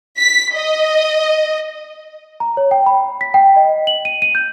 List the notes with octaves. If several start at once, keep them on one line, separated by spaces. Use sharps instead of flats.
B6
D#5
A#5
C#5
G5
B5
B6
G5
D#5
F#7
D#7
D#7
G6